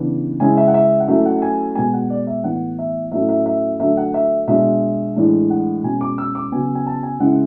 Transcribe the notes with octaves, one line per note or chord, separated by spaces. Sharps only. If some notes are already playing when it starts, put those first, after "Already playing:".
Already playing: C#3 E3 B3 D4
C#3 G#3 C#4 E4 G#5
E5
F#5
E5
F#5
F#3 A3 C#4 E4 E5
F#5
G#5
B2 G#3 B3 G#5
F#5
D5
E5
A2 E3 B3 F#5
E5
A2 F#3 A3 C#4 E4 E5
E5
E5
D3 F#3 A3 E5
F#5
E5
B2 G#3 D4 E5
A2 E3 G#3 D4
F#5
B2 G#3 C#4 G#5
D6
E6
D6
C#3 F#3 B3 G#5
G#5
A5
G#5
C#3 G#3 C#4 E4 F#5